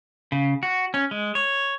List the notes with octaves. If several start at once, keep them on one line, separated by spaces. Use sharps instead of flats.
C#3
F#4
C#4
G#3
C#5